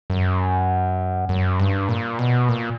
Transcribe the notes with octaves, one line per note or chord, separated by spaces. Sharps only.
F#2
F#2
G2
A#2
B2
A#2